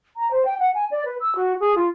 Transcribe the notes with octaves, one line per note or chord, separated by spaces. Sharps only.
A#5
C5
G5
F#5
G#5
D5
B4
E6
F#4
G#4
F4